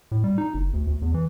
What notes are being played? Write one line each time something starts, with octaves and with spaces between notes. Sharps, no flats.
A2
G3
D#4
F#1
D2
D2
E2
E3